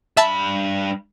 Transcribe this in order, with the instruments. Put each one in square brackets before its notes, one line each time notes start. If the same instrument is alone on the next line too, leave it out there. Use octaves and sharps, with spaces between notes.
[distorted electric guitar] G2 B5 [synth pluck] E5 A5 E6